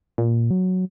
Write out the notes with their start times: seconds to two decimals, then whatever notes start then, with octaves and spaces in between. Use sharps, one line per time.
0.18 A#2
0.51 F#3